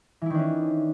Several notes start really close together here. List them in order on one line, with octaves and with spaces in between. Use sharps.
E3 E4 D#3 D4 C#4